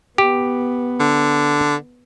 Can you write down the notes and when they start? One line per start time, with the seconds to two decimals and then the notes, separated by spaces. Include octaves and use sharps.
0.18 B3 G4
1.00 D3